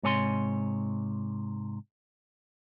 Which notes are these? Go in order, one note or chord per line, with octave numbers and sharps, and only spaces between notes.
G#2 C3 C#5 G#5 B5 C6